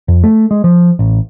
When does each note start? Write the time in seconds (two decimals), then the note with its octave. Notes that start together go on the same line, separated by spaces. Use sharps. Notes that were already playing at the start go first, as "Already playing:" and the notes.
0.08 F2
0.24 A3
0.51 G#3
0.64 F3
0.99 A1